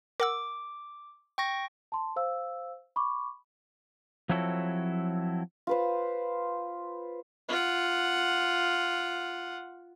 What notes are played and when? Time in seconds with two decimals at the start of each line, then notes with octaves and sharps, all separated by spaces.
0.20 A#4 F#5 D6 E6
1.38 G5 C#6 A#6
1.92 A5 C6
2.16 C5 F5 E6
2.96 B5 C#6 D6
4.29 F3 F#3 C4 E4 A4 C#5
5.67 F4 B4 C5
7.49 F4 F#5